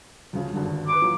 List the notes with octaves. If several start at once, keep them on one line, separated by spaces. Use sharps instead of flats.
D2 C#3 F3
G#1 G2 D3
B4 B5 C6 D6
A#2 E3 F#3